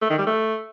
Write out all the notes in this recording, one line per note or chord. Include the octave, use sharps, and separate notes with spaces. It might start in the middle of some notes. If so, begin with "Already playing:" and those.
A3
D#3
G3
A3